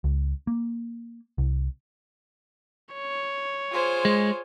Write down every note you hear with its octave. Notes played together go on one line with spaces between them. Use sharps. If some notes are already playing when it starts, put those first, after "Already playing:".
C#2
A#3
C2
C#5
F4 G#4 C5
G#3